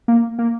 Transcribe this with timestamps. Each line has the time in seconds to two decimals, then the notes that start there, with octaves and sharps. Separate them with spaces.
0.08 A#3
0.39 A#3